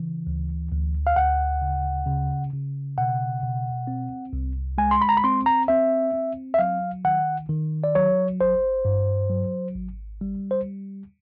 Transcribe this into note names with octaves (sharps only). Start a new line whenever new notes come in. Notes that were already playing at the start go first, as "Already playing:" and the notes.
Already playing: C#3 E3
D2
D2
F5
D2 F#5
C#3
C#3
C#3
B2 F#5
B2
C4
C2
G#3 G#5
C6
B5
A#5
B5
C4 C6
A#5
C4 E5
C4
E5
F#3 F5
D#3 F#5
D#3
D5
F#3 C#5
G#1 C5
G2
F#3
G#1
G3
C5